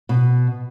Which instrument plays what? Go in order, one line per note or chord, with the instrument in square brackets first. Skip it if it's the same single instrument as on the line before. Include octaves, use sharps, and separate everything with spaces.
[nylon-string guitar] B2